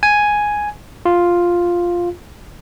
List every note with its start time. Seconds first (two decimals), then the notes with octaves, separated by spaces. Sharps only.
0.03 G#5
1.05 F4